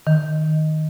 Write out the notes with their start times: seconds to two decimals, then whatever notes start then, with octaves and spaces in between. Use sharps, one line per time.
0.07 D#3